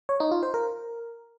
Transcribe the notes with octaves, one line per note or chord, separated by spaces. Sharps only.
C#5
D#4
F4
C5
A#4